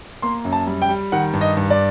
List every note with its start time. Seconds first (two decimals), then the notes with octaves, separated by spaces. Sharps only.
0.22 A#3 C6
0.45 F#2
0.52 A5
0.67 G3
0.82 G5
0.89 G3
1.12 D#3 F#5
1.33 G2
1.41 D#5
1.57 G2
1.70 D5